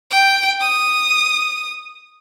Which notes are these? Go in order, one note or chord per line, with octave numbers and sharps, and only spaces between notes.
G5
D#6